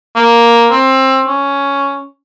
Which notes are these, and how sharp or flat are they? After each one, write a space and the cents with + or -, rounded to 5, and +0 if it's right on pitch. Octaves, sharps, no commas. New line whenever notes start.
A#3 +5
C4 +20
C#4 +5